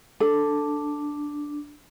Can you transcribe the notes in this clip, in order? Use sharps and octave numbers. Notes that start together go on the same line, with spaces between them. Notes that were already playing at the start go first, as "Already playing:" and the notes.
D4 A4